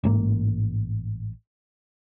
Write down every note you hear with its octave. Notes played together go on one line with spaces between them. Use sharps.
A1 G#2 A#3